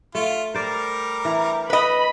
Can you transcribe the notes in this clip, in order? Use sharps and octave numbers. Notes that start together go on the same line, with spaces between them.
A3 F4
G3 A#4 C5 D5 A#5
E3
B4 D#5 B5